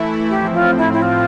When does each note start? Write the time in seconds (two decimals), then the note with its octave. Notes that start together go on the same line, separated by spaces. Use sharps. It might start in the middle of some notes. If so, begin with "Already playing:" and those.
Already playing: E3 A3 E4
0.30 A2 F3 C4 G4
0.54 F4
0.78 E4
0.93 E4
1.02 F4